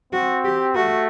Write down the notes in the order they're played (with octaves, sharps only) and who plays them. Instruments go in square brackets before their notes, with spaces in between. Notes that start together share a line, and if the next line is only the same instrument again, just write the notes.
[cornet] C4 [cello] F#4
[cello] G4
[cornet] A3 [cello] F#4